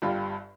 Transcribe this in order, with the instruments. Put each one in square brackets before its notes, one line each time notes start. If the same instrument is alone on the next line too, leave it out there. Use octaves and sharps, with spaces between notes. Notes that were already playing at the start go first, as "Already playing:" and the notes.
[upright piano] G1 G2 G3 F4